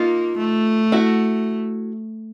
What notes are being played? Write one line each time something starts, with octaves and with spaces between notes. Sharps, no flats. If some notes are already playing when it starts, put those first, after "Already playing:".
Already playing: A#3 D#4 F4
A3
E4 F#4